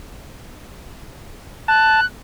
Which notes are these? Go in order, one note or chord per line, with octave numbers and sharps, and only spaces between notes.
A5 F#6